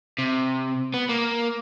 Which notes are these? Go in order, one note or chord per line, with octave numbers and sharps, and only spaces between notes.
C3
B3
A#3